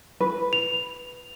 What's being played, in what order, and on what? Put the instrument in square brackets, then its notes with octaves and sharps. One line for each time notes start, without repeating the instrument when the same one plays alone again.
[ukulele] B4
[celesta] F7